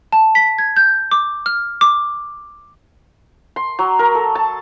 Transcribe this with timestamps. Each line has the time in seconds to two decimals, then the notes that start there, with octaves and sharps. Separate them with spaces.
0.12 A5
0.35 B6
0.59 G#6
0.77 G6
1.12 D6
1.46 F6
1.81 D6
3.56 C6
3.79 F#3
3.99 A#4
4.15 A4
4.35 A5